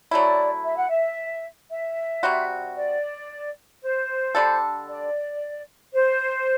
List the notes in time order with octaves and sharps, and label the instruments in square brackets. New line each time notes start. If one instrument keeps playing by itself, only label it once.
[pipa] F#3 A3 E4 [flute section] D5
[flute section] E5
F#5
E5
E5
[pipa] C3 G3 C4 F#4
[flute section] D5
C5
[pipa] D3 G3 D4 A4
[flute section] D5
C5